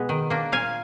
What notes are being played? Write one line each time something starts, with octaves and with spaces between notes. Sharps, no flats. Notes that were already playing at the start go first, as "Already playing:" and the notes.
Already playing: B2 G#3 B3
D#3
A#3 D4
A#2 F5 G#5